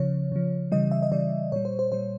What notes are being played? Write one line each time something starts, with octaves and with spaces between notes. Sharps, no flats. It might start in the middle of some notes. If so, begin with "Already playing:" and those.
Already playing: C#3 F3 C#5
C#3 F3
C#3 E3 G3 D#5
E5
D#5
C#3 E3 G3 D5
A#2 G3 C#5
C5
C5
A#2 G3 C5